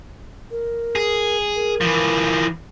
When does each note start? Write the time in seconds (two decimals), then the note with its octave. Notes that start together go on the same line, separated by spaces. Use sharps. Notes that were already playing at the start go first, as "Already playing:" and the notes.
0.51 A#4
0.96 G#4
1.55 A#4
1.81 E3 F3